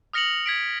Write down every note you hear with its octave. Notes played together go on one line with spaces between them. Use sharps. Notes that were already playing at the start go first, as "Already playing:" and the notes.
D#6 F6 A#6 C#7 F7 F#7
G#6 B6 D7